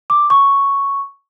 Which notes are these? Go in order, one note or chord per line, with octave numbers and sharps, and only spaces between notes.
D6
C#6